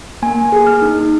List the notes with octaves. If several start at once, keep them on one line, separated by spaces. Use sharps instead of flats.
A#3 G#5
G#4
F6
D#4